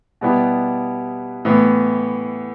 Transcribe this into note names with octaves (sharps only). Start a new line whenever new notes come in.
B2 G3 B3 E4 G4
A2 E3 B3